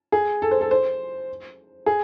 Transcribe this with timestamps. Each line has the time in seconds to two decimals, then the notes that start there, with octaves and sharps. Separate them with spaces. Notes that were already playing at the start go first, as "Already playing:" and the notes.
0.12 G#4
0.42 A4
0.51 C5
0.61 A4
0.71 C5
1.86 G#4